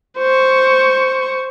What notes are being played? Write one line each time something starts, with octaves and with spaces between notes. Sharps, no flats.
C5 C#6